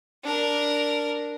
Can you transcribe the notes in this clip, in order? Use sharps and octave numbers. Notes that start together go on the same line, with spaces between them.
D4 A#4